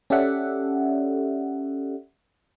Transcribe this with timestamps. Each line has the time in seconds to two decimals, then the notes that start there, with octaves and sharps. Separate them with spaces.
0.10 C#4 G4 A4 D5 E5 F#5